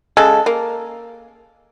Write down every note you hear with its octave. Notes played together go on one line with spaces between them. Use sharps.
C#3 G#3 A4
A#3